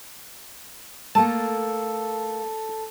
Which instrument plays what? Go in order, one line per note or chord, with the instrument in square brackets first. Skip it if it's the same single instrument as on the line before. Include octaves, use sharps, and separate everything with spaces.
[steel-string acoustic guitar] A3 A#3 [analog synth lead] A4 [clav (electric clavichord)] A5